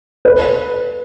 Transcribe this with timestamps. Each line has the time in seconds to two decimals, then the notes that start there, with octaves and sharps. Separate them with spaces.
0.25 B4